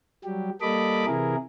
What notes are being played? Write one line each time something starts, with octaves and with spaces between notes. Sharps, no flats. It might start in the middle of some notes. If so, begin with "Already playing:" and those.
F#3 G3 G4
G3 A#3 A4 D#5 B5 D6
C3 E3 E4 G#4 A#4